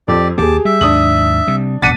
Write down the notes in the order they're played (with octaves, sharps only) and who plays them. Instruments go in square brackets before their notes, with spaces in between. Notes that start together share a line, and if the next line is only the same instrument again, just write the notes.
[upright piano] F2 [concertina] G4 D5
[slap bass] D#2 A#3 [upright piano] G4 G#4 [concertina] A5 D6
[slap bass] G3 [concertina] E5
[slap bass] D#2 G#2 [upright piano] D4 D#6 F#7
[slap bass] C3 G3
[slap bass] D1 B1 B2 [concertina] D4 F#5 [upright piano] A6 B6 D#7